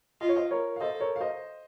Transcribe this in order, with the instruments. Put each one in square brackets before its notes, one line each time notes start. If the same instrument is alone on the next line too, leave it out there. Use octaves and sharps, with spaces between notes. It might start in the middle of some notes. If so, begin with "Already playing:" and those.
[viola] F4 [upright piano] D#5
[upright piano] C#5
C5 D#5
A#4 C#5
F5
[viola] A4 [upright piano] C5 D#5
[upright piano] A#4 C#5
F5
C5 D#5